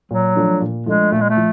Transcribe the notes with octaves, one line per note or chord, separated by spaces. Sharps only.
A#2 F#3
F3 A3 D4
A#2
F3 G#3 A3 D4
A#2 A3
G#3
A3
F3